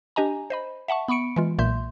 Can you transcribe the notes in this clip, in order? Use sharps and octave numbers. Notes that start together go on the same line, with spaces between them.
D4 G4 D#5 G#5 A#5
C5 D#5 B5
E5 F#5 A5 C#6
B3 B5 C#6 C#7 D7
E3 G#3 F4
B1 A#2 A#3 E5 C6 G6